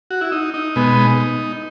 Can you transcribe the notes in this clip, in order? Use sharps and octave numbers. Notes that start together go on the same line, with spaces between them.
F#4
E4
D#4
D#4
B2 G#3 B3